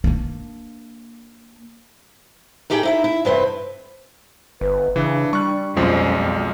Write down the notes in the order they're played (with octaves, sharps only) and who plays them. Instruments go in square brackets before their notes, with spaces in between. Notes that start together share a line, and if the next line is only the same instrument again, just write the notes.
[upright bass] A#3 D4
[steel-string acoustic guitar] A2 D#4 G4 G#4 E5 G5
D#4 E4 E5
E4
E2 G2 C3 B4 C5
[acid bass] G1 [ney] B4
[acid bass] C#3 [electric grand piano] E3 [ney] D4
[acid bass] G3 [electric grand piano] C#6 F#6
[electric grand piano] B1 F3 G#3 [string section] F2 [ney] C#4